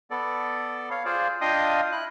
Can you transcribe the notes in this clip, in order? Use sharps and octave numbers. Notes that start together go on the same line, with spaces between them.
B3 A4 D5
C#5 F5
F4 G#4 C5 D5
D4 F4 D#5 F5 G5 D#6
E4 F#6